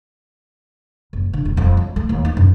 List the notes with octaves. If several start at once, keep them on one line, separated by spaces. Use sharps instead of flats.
F#1
D3
D#1
F2
F#3
A3
D#2
D#4
F#2